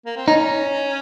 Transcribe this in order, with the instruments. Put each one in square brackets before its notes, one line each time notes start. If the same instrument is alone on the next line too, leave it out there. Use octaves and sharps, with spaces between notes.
[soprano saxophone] A#3
C4
[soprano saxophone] C#4 [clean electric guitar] D#4